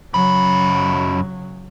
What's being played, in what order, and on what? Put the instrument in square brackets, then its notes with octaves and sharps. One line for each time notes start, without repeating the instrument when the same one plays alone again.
[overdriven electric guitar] F#2 B5 [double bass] C#3 F#3